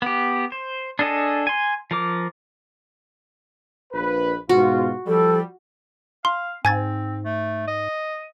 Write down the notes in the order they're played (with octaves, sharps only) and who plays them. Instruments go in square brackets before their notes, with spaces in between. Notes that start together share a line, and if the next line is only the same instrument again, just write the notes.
[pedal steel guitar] B3 G4
C5
D4 G#4 A4 D#5 G#5
G#5 C6
F3 A#4 D6
[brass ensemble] A#1 B4
[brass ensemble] G#2 B2 F4 [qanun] F#4
[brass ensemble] F3 G3 [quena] A4
[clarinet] F5 [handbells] C6
[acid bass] G#2 [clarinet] C4 [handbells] G#5 G#6 A6
[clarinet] A3
D#5